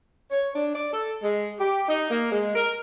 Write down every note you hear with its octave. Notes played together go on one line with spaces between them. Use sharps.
C#5
D4
D5
A4
G#3
G4
D#4
A#3
G#3
A#4